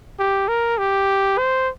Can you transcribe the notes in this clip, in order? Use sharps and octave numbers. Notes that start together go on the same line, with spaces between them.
G4
A#4
G4
C5